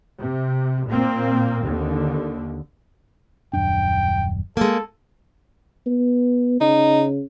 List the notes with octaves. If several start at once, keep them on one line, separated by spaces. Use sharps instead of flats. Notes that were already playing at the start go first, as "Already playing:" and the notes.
C3
A#2 A#3 C4
D#2 D3
D#1 F#2 D4 G5
G#3 A#3 A4
B3
C#3 D#4